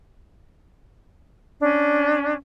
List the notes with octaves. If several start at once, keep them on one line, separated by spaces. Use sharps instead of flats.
C#4 D4